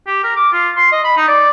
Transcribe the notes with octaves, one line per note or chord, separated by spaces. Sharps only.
G4
A#4
D6
F4
C6
D#5
B5
D#4
D5